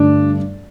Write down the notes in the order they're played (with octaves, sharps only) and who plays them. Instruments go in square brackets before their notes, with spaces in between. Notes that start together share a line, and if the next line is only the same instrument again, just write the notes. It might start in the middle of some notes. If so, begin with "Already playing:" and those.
Already playing: [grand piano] G2 D3 A3 [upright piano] D4